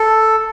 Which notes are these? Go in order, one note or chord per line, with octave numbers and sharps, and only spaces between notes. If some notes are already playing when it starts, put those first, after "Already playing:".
Already playing: A4